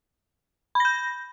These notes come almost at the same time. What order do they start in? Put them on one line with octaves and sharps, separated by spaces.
B5 A#6 G6